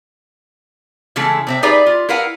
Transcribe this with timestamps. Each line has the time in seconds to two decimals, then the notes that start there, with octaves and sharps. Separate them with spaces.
1.16 C#3 E3 G#3 A3 A4
1.47 C3 C4 E5
1.63 D#4 G4 G#4 B4 D5 E5
1.86 F4
2.09 E4 A#4 B4 F5 F#5